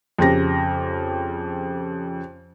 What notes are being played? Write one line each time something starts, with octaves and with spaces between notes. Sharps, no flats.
F2 C#3 G4 A#6